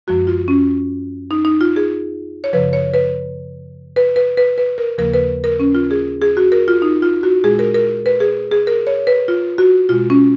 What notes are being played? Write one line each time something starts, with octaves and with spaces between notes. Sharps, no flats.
F#2 F3 G#3 F#4
F4
C#4
D#4
D#4
F4
G#4
C#5
F#2 C#3 F3 B4
C#5
B4
B4
B4
B4
B4
A#4
D#2 C#3 F3 A#3 A#4
B4
A#4
C#4
F4
G#4
G#4
F#4
A#4
F4
D#4
F4
F#4
A#2 G#3 G#4
A#4
A#4
B4
G#4
G#4
A#4
C#5
B4
F4
F#4
B2 G#3 F4
C#4